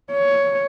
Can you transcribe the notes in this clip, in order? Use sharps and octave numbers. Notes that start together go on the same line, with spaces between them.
C#5